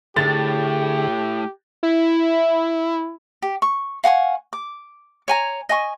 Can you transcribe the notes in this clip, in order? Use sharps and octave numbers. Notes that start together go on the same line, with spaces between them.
A2 D3 G4 G#4 A6
E4
G4
C#6
F5 F#5 G#5 C#6
D6
C#5 G#5 A#5
D#5 G#5 C#6